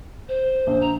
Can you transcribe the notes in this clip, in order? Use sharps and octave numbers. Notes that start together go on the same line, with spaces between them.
C5
A#1
A#5